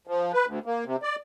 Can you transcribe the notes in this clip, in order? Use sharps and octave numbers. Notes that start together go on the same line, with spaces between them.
F3
B4
D2
A#3
C3
D5